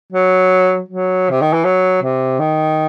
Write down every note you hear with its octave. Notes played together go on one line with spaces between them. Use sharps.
F#3
F#3
C3
D#3
E3
F#3
C3
D#3